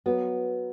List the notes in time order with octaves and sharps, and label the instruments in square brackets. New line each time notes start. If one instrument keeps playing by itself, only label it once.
[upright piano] F#3 [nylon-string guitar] B3